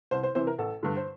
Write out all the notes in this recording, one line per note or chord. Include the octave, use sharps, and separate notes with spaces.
C2 C5
C5
C3 E3 C5
A#4
A1 A4
G2 D3
C5